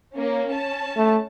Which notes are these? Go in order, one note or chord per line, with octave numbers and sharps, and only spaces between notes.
A#3 C#4
C#4 A5
A3